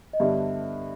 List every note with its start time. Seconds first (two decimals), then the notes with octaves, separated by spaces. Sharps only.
0.13 D#5
0.20 G2 D3 G3 B3 E5